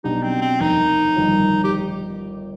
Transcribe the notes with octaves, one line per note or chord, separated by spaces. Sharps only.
B1 B2 B3 D4 D#4 G4
C4
C4
F1 D#2 D#3 D#4
G1 F2 D#3
G4